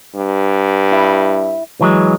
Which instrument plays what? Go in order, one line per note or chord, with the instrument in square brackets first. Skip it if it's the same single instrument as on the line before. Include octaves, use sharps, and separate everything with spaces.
[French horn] G2
[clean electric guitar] E4
E3 F#3 G#3